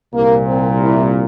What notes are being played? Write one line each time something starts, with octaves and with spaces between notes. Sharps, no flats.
C2 A#2 A#3
C4
E4